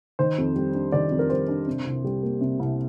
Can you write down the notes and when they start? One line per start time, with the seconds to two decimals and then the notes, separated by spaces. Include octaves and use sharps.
0.19 D#3 C5
0.38 F2
0.56 G3
0.74 D4
0.92 D#3 D5
1.11 F2
1.19 A#4
1.30 G3 C5
1.48 D4
1.67 C3
1.86 C2
2.04 G3
2.23 A#3
2.41 C3
2.59 C2